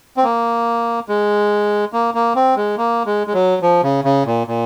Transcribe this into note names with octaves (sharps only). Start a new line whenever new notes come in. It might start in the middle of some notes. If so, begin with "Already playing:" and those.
C4
A#3
G#3
A#3
A#3
C4
G#3
A#3
G#3
G#3
F#3
F3
C#3
C#3
A#2
A#2